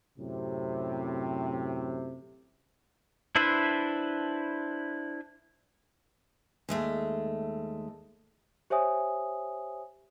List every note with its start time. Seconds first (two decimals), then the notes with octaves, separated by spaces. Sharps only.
0.18 F#2 A2 C3
3.35 D4 E4 B4 C5 E5
6.69 D#2 G#3 A3
8.70 G4 C5 C#5 E5 G#5 D#6